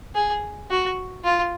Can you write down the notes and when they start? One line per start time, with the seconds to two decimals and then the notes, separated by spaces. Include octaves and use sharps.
0.15 G#4
0.70 F#4
1.24 F4